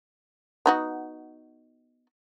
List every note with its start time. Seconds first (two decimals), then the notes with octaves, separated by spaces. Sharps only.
0.66 B3 D#4 F#4